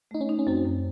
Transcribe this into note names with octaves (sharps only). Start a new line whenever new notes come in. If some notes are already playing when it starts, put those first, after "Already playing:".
A3 D#4
C#4
D#4
C#4
F#2 C4
F#2